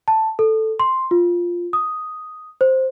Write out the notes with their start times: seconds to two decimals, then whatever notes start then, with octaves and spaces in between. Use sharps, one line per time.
0.08 A5
0.39 A4
0.80 C6
1.11 F4
1.73 D#6
2.61 C5